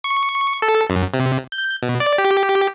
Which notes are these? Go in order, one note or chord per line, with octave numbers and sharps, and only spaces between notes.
C#6
A4
F#2
C3
G6
B2
D5
G4